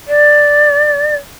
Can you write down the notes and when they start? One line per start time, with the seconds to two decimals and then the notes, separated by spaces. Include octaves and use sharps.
0.07 D5